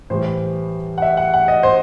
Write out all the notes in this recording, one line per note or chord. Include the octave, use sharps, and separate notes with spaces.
A2 E3 G3 C5
F#5
E5
F#5
F#5
D#5
C5